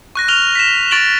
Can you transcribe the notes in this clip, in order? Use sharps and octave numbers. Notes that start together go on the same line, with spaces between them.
C#6 F#6 A#6
C#6 F6 F7 G7
B6 E7
C#6 A6 D7 E7 F#7 G7